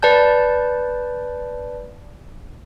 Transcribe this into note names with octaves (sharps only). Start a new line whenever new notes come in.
B4 D5 A5 G6